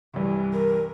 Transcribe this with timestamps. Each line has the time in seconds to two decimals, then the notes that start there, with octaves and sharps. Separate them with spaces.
0.14 C2 G2 C3 E3 G3
0.53 A#4